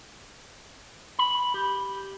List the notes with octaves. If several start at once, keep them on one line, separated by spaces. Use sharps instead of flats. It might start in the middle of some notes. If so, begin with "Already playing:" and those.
B5
G4